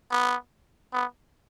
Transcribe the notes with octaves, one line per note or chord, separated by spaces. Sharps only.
B3
B3